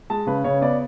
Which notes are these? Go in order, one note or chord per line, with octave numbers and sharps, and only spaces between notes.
G#3 A5
C#3 B4
C#3 C#5
B3 D5